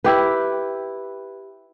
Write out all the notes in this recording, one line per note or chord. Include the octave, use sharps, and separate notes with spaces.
E4 G4 B4